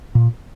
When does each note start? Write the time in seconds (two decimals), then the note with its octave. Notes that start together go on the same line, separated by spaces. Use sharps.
0.15 A#2